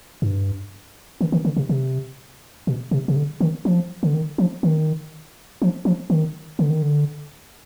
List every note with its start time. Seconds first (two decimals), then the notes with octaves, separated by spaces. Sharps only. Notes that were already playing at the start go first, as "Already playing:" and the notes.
0.22 G2
1.21 D#3
1.32 D#3
1.45 D3
1.57 C3
1.69 C3
2.67 B2
2.91 C3
3.08 C3
3.16 D3
3.41 D#3
3.65 F3
4.03 D3
4.14 D#3
4.38 F3
4.63 D#3
5.62 F3
5.85 F3
6.10 D#3
6.59 D3
6.70 D#3
6.82 D3